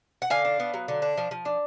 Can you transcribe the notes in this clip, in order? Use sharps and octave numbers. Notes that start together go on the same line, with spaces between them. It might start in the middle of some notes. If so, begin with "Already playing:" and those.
F#5
D3 F5 G#5
D4
B3
F#3
D3
D4
F3
F3
D4